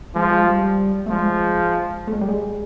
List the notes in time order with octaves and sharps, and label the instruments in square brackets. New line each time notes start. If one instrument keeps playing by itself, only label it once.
[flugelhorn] F3 [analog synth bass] G#3
[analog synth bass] G#3
G3
A3
[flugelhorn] F3 [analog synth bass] G#3
[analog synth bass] A3
G#3
G3
G#3